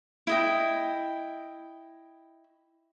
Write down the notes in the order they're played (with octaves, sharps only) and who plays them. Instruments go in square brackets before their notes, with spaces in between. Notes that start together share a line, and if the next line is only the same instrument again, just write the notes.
[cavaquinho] E4 D#5 G5